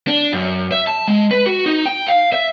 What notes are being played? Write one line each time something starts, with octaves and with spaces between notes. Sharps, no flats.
D4
F#2
E5
A5
G#3
B4
F#4
D#4
G5
F5
E5